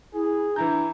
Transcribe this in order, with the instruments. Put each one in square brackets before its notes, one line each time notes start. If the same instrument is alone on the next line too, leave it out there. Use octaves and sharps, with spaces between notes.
[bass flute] E4 [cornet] G#4
[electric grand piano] E3 E4 G6 [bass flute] D4 [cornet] A#5